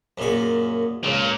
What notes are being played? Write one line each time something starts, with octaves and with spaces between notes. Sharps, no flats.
F#2 A#2 G#4
C#2 A#2